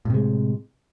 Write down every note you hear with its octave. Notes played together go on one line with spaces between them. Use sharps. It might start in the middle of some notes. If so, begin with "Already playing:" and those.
A2 C3 G#3